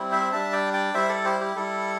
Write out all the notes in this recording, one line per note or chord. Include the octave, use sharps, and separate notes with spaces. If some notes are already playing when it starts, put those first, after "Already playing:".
Already playing: G3 C4 E4
C5 E5
G3 D4 E5 A5
D5 G5
D5 G5
G3 E4 C5 E5
A4 D5
G4 C5
G4
G3 E4 A4